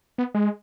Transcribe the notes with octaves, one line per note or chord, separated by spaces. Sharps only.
B3
G#3